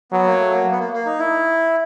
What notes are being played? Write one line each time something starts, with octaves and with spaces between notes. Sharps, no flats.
F#3 B3
A#3
A3
A#3
B3
A#3
A#3
D#4
E4